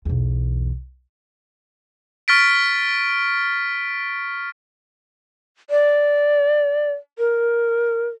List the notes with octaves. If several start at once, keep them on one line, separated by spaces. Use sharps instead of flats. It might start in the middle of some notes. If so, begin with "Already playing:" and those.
B1 E2
C#6 F6 A6 B6 D7
D5
A#4